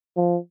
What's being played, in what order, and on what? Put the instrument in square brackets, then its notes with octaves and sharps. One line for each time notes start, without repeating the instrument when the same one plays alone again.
[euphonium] F3